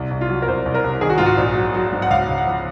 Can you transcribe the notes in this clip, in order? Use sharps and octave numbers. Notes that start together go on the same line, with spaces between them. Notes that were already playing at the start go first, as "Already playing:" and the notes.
Already playing: C2
C2
F4
F#3
A#4
C2 C5
C2
A#4
C2
D#3 G#4
F#4
G#2 F4
F#4
A#1
F#3
F#3
G#2
F#5
C#2 F5
C#2
F#5
F3